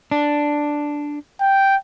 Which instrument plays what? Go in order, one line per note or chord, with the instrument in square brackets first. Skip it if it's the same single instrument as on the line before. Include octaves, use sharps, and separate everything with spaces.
[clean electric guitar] D4
[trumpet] G5